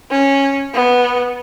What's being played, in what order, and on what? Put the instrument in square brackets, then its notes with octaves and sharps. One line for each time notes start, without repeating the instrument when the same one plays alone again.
[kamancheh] C#4
B3